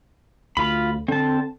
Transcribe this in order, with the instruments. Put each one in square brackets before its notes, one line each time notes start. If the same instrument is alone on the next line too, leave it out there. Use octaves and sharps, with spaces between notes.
[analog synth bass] D2 [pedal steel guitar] F4 B5
[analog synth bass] D3 [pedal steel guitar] C4 A5